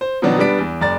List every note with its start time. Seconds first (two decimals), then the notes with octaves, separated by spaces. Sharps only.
0.01 C5
0.22 B2 D#3 F3 F#3 B3 D4
0.39 G3 B3 D4 B6 D7
0.59 E2
0.81 F#1 D5 A#5 A6